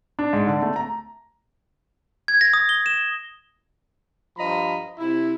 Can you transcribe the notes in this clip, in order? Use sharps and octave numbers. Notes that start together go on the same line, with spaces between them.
D4
G#2
D3
A3
A#5
G#6
A#6
D#6
G7
E7
G2 F3 D#5 A#5 B5
C3 E4